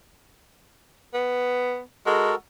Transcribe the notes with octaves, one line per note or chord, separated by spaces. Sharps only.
B3
G#3 F#4 A4 A#4